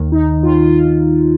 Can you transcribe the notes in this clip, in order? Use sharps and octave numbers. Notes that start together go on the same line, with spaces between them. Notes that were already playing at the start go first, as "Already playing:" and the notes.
Already playing: D#2 D#3
D#4
D#2 D#3 F4
F4
F4